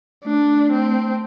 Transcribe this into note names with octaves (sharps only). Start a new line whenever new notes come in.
A3 D4
A3
C4
A3